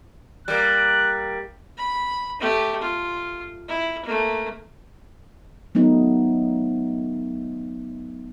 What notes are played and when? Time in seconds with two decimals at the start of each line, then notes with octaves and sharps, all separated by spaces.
0.48 G3 A#3 F#6
1.78 B5
2.40 A3 G4
2.81 F4
3.68 E4
4.05 A3 A#3
5.75 F#3 A3 B3 D#4